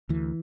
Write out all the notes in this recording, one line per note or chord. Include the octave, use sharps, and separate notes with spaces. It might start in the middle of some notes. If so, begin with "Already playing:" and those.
D2 E3